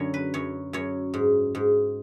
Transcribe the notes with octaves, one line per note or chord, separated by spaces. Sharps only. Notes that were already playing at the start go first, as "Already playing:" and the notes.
Already playing: F#2 D3 C#5
B4
F#2 C#5
F#2 C#5
G#2
G#2